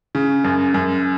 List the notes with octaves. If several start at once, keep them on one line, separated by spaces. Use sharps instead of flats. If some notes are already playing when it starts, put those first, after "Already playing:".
C#3
F#2
F#2